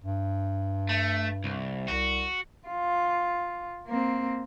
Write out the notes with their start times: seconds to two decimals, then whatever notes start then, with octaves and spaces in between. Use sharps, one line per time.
0.04 G2
0.89 A3
1.44 C2
1.88 C2 F#4
2.68 F4
3.87 A#3 C4